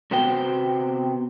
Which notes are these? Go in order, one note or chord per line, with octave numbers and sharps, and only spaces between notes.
C3 B3 F#4 C5 G5